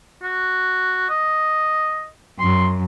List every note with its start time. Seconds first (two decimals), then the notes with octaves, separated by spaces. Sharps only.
0.23 F#4
1.09 D#5
2.39 F#2 C6